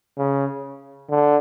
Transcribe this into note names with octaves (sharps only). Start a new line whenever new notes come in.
C#3
D3